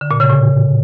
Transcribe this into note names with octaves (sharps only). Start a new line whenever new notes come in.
D3
A#2
C#3
A2